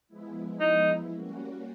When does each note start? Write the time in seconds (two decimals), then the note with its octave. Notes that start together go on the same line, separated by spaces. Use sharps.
0.08 F3 G#3 B3 E4
0.60 D#4
1.11 G3 A#3 C#4 F#4